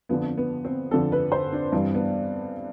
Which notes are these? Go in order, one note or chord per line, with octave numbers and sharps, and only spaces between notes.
F2 D3 F3 B3
B3
C4
F2 D3 F3 A4
B4
C5
D4
G2 E3 G3 C4
B3